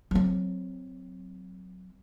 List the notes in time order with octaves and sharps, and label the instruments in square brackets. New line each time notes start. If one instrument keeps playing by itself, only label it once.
[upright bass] F#3 C4